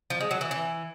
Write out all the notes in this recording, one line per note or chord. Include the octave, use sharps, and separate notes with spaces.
F3
G#3
F#3
E3
E3